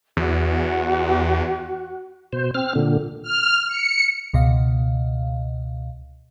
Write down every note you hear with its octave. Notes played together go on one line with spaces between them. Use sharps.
E2 F#4 F#6
B2 C5
C4 F6
A#2 D3
F6
C#7
C#2 B2 D#5 F5